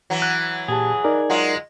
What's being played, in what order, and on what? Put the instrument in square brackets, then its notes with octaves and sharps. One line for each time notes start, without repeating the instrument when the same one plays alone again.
[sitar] E3 F#3
[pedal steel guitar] F#6
[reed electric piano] A#2 G4 A5 [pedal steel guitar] G#4
[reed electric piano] D#4 A#4 D5
[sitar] F#3 G#3 F4